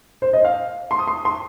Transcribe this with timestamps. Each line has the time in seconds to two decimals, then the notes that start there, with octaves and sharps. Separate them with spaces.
0.22 C5
0.33 D#5
0.45 F5
0.91 C6
0.99 D#6
1.07 C6
1.25 C6